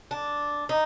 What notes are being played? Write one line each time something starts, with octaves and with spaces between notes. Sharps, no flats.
D4
D#4